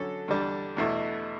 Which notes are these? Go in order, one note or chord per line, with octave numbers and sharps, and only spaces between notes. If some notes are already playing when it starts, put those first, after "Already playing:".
Already playing: D3 F#3 C#4 A4
E2 D3 G3 D4
E2 B2 A3 E4